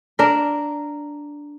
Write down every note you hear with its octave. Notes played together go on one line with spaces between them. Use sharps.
D4 A#4